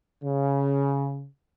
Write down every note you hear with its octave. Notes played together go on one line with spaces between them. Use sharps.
C#3